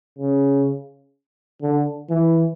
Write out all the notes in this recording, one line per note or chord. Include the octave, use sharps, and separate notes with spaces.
C#3
D3
E3